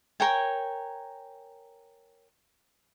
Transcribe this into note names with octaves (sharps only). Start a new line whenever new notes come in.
A#4 C#5 G5 G#5